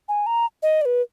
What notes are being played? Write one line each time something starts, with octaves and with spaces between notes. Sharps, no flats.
G#5
A#5
D#5
D5
B4